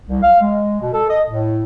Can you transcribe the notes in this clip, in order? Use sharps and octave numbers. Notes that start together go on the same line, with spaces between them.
C2
F5
G#3
B2
A4
D#5
A2